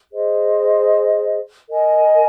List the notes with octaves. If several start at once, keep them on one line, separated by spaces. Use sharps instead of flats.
G#4 C5 D#5
A#4 D#5 G#5